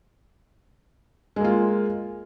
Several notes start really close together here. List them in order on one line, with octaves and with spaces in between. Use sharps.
G#3 A#3 F4